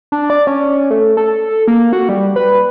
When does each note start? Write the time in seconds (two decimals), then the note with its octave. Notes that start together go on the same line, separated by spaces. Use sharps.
0.12 D4
0.30 D5
0.47 C#4
0.90 A3
1.17 A4
1.68 A#3
1.93 F#4
2.09 G3
2.36 B4